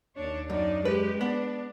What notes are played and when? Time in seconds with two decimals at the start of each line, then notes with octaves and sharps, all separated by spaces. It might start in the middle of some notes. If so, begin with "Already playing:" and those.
0.15 D#2 D4 C#5
0.50 F#2 D4 D#4 D5
0.85 G#3 G4 B4
1.21 B3 D4